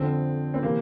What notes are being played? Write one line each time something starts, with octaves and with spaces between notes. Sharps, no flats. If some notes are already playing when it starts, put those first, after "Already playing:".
Already playing: F2 D3 C4
C4
C3 E3 A#3